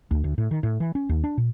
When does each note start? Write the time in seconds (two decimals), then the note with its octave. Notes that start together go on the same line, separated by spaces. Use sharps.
0.11 D2
0.24 D2
0.38 A2
0.51 D#3
0.63 A2
0.80 E3
0.95 C#4
1.09 D#2
1.24 D4
1.38 A#2